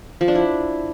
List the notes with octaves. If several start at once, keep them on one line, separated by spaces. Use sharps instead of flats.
F3
D4
E4